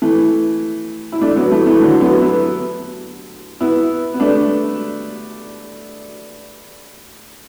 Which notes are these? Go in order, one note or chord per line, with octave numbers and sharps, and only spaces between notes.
E3 A3
E4
A3 D4
F#3 B3
E3 A3
E3 A3
D3 F#3
F#3 B3
B3 E4
B3 E4
B3
A3 D4